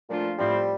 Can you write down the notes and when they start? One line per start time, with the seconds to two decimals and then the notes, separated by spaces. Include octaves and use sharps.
0.09 A#2 F3 A3 D4 F4
0.38 A2 F3 G3 C4 E4